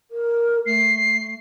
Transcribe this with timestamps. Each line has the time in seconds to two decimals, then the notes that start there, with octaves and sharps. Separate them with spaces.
0.11 A#4
0.66 A3 C7